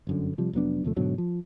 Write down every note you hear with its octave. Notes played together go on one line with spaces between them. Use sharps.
G1 F#2 D3
C3 F3 G3
F1 F#3 B3 D4
D#2 C3 F3 A3
G#2 B2 D3 F#3
F3